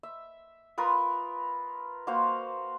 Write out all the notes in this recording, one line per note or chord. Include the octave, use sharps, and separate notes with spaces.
E5
F4 A#4 B4 D#6
A#3 F#4 C5 F5